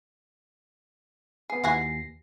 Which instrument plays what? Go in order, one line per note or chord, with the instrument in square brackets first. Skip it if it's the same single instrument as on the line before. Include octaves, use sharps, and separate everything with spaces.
[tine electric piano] B3 C7 [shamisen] G#4
[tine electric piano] D#2 A#6 C7 [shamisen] E3 F#4 G#4